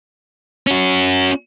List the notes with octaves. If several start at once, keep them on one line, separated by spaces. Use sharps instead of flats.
C#4 F#4